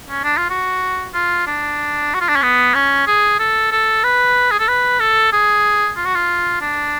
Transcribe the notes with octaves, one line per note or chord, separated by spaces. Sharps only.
C#4
D4
F4
F#4
F4
D4
F#4
F4
D4
C#4
B3
C#4
G#4
A4
A4
B4
G#4
A4
B4
A4
G#4
F4
F#4
F4
D4